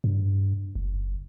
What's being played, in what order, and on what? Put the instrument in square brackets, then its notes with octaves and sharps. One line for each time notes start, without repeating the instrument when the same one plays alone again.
[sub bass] G2
F#1